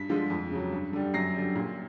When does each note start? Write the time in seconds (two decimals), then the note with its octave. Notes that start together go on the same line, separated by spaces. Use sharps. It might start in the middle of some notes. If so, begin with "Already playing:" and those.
Already playing: G2 B6
0.09 D3 F3 G#3
0.30 F2
0.51 C#3 F#3
0.72 G2
0.93 D3 G3
1.14 F#2 A#6 C7
1.35 D3 G3
1.56 A#2